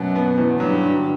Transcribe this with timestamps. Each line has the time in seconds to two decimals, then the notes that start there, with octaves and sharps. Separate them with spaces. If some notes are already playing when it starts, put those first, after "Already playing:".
Already playing: F#2 B2 F#3
0.16 B3
0.38 E2
0.60 G2 F#3 G3
0.82 D3